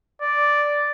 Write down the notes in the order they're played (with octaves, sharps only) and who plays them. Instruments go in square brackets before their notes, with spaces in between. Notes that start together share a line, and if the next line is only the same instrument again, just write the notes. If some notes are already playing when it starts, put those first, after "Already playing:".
[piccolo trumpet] D5